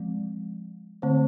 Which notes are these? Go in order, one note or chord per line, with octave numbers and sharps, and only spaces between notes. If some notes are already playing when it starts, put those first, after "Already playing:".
Already playing: F3 G#3 C4
D3 A3 C4 C5